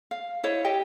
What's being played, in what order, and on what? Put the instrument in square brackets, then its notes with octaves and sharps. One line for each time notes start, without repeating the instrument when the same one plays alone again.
[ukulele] F5
E4 C5 C#5 D#5
G4 D#5 G5